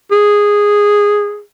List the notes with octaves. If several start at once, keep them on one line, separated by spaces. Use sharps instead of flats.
G#4